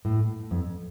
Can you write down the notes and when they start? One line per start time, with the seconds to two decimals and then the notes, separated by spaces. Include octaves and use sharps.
0.05 A2
0.51 F2